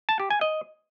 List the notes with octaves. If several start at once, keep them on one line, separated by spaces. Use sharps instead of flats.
A5
G4
G#5
D#5